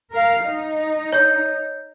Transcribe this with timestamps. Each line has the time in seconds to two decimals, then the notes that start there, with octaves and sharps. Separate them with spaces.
0.13 A#4 F5
0.43 D#4
1.12 C#5 G6